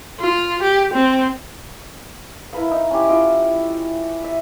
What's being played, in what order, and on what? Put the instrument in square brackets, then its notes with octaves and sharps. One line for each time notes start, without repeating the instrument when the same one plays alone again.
[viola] F4
G4
C4
[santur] E4 A#4 B4 F5
D#4
C#4 E4 G4
E4 F4 D#5 G5
D#5 E5